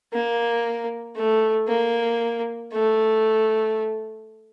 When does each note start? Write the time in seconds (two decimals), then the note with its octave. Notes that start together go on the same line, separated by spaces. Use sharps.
0.13 A#3
1.16 A3
1.67 A#3
2.71 A3